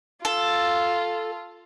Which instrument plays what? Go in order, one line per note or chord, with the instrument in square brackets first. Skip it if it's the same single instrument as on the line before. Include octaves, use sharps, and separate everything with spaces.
[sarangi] F4 [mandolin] A4